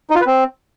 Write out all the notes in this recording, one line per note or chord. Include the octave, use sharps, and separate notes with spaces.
D#4
F4
B4
C4